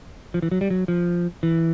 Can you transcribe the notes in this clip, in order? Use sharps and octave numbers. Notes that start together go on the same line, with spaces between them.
F3
E3
F#3
G3
F#3
F3
E3